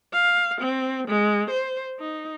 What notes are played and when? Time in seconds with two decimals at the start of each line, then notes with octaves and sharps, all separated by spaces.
0.13 F5
0.61 C4
1.08 G#3
1.50 C5
2.00 D#4